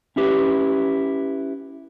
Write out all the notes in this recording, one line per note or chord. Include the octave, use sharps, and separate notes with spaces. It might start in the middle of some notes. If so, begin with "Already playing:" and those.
C#4 E4 G4 B4